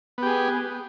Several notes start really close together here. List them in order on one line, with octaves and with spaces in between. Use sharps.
B3 G4 G#4